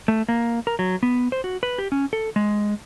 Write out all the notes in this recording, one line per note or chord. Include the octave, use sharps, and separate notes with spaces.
A3
A#3
A#4
F#3
B3
C5
F#4
B4
G4
C#4
A4
G#3